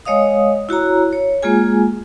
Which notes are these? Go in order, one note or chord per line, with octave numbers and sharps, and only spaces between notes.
G#3 C#5 D#5 F5 D#6
E4 F#4 C#5 A#5
C#5
G#3 A#3 F4 G#4 G#5